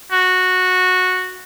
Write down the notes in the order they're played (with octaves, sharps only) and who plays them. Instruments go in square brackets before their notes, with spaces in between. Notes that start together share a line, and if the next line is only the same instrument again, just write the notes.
[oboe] F#4